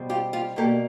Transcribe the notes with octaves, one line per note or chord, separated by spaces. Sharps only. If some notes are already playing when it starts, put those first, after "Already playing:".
Already playing: B2 G3 C4
F4 G4
F4 G4
B2 G3 A#3 G4 A4